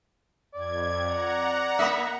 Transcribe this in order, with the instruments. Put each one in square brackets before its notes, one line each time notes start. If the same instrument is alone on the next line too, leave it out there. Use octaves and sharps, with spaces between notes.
[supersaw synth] F2 G#6 [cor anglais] D5
[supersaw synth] F#5 A#5
[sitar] A#3 D#5 E5